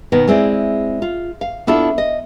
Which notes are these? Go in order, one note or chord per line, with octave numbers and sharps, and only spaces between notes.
B2 D#3 B3
G#3 C4 E4 D5
F4
F5
B3 D4 E4 F4 A4
D#5